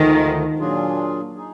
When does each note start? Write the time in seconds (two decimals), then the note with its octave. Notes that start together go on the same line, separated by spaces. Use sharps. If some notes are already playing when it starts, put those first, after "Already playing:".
Already playing: D2 D3 D#3 F3 G#3 D#4
0.59 A#2 F#3 D4 F4 G#4
1.36 D#4 G#4